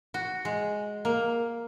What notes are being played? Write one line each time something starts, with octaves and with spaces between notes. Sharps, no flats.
F#4
G#3
A#3